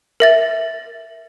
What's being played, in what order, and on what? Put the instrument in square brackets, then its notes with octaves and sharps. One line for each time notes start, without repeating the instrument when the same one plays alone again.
[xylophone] A#4 E5 A6